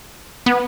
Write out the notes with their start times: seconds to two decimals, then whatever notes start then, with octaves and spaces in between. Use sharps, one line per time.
0.46 B3